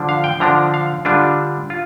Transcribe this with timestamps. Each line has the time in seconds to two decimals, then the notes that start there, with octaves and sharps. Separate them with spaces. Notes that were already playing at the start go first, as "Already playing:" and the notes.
Already playing: D3 F3 D4
0.09 F5
0.24 G5
0.40 D3 F3 D4 A#5
0.74 F5
1.05 D3 G3 D4 F4
1.70 F4